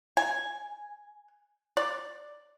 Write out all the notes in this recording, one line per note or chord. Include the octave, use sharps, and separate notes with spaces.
G#5
D5